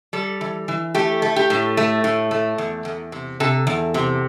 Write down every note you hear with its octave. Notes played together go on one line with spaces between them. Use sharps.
G3 A4
E3
E3
A3 G4
A3
G4
A2
A3
A2
A3
E2
E2
C3
C3 A4
E2
C3